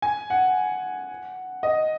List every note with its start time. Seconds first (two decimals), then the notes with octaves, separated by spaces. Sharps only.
0.02 G#5
0.30 F#5
1.63 D#5